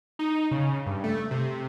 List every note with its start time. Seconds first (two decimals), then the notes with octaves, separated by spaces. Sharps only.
0.19 D#4
0.51 C#3
0.86 G2
1.04 A3
1.31 C3